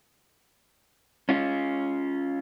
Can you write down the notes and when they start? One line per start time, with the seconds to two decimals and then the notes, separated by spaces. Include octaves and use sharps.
1.29 C#4 F4